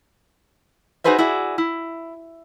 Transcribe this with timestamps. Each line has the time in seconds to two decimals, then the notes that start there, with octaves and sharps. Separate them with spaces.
1.04 D#4 F#4 G#4 B4 C5 E5
1.18 E4 F#4 G#4 D5 E5
1.58 E4